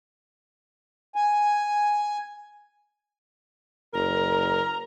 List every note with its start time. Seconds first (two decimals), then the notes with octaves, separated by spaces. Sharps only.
1.16 G#5
3.94 F#1 A#4 A#5